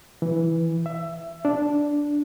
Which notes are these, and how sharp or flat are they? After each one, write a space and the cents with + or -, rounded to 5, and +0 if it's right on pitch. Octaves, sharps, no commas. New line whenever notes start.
E3 +0
E5 +15
D4 -5